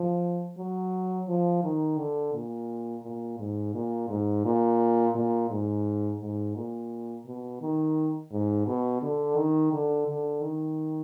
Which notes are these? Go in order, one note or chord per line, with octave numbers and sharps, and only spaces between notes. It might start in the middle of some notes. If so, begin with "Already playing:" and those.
Already playing: F3
F#3
F3
D#3
D3
A#2
A#2
G#2
A#2
G#2
A#2
A#2
G#2
G#2
A#2
B2
D#3
G#2
B2
D3
D#3
D3
D3
D#3